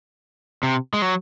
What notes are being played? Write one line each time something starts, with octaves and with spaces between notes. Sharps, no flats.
C3
G#3
F#3